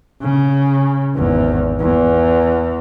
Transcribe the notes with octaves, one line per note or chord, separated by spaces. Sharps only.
C#3
G#1 E2
E2